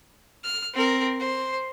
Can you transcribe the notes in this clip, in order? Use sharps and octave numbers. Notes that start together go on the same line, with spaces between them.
F6
C4 A#4
C5